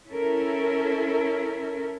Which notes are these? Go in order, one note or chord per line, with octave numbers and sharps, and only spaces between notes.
C#4 E4 A4 A#4